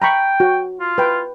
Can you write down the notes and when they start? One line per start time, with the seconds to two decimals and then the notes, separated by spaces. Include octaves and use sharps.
0.02 G5 A#5 B5 C#6
0.40 F#4
0.80 F4
0.98 B4 G5